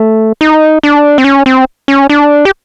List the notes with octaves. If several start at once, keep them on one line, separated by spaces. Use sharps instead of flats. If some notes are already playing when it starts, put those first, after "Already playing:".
Already playing: A3
D#4
D4
C4
C#4
C4
C#4
D4
G4